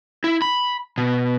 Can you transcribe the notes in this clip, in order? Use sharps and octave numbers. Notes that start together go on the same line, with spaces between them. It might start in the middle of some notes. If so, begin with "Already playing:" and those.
E4
B5
B2